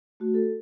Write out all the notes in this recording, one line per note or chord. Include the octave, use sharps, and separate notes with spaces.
A3 F#4
A4